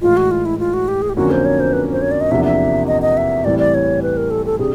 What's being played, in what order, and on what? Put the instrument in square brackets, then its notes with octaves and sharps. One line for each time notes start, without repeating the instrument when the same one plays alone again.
[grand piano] A2 E3 G#3 [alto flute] F4
[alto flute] F#4
F4
E4
F4
F#4
G4
G#4
G4
[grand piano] F2 D3 F#3 A#3 C#4 [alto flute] F#4
[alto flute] C5
C#5
C5
B4
C5
C#5
D5
D#5
[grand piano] E2 C3 F3 A#3 D4 [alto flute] E5
[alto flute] E5
D#5
D#5
E5
[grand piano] A2 E3 G3 C4 E4 [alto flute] D5
[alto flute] D5
C#5
B4
A#4
A4
A4
[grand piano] C3 D4 G4 [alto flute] G#4